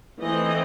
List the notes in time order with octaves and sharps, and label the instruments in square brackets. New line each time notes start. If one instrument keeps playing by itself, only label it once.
[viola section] E3 A3 C4 D#5